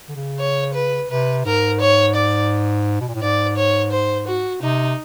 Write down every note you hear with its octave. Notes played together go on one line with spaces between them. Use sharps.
D3
C#3
C#5
B4
C3 B4
G#2 A#4
C#5
D5
B2
A#2
A2
G#2 D5
C#5
C5
F#4
C3 D#4